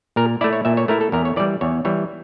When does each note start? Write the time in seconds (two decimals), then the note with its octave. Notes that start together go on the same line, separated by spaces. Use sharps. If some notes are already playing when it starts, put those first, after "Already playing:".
0.16 A#2 A#4
0.41 A3 E4 D5
0.53 C#5
0.65 A#2 E5
0.77 C#5
0.88 A3 E4 A#4
1.01 A4
1.12 E2 A#4
1.25 C#5
1.36 E3 G3 D5
1.61 E2 C#5
1.85 E3 G3 C#5